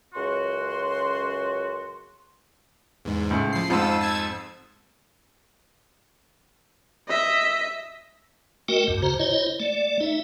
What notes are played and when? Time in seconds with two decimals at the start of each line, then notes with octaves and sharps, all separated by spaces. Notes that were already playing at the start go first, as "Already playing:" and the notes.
0.14 C#2 F#2 F#4 C6
3.05 E2 G#2
3.31 C#2 A2
3.53 F3 C7
3.70 F2 G#2 F4 E6
4.01 A5 E6 G#6
7.08 D#5 E5
8.68 A3 F#4 A#4 D#5 G5
8.88 D2 G2
9.02 C#3 F#4 C5 A#5
9.20 E4 C5 C#5 D#5
9.60 A3 D5
10.00 D#4 E5